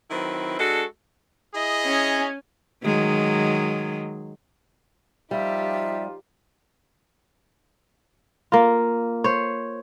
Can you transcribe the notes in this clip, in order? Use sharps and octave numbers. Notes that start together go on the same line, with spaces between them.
D#3 F#3 C4 E4 B4
G#3 D4 F#4 A4
E4 G#4 D#5
C#4 G#5
D#3 F#3 G#3
F3 G3 D#4 F4 G4 E5
A#3 F4
C5 C#5